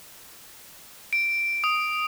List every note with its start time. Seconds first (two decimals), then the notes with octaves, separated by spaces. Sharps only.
1.13 D7
1.64 D#6